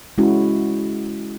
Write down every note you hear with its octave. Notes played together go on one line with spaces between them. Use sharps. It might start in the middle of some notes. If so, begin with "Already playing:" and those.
G#3 C#4 E4 F#4